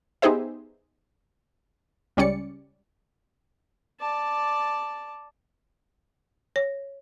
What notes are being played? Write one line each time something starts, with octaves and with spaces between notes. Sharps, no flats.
B3 D#4 G4 G#4 C5 E5
C#2 G3 C#4 D5 C#7
D5 A5
C#5